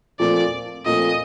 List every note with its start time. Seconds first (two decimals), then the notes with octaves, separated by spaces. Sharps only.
0.19 A#2 F3 A3 C4 D5
0.86 A#2 F3 A3 C4 D#5